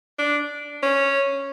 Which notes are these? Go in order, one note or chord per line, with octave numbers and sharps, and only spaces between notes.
D4
C#4